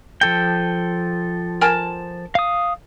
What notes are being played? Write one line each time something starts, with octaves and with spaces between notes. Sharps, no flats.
F3 A4 G5
A#4 G#5 A5
F5 D#6